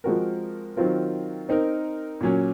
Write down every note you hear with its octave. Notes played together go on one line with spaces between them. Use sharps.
F3 G#3 C4 F#4 A#4
D#3 F#3 C4 F4 A#4
C4 D#4 A#4
A#2 F#3 C#4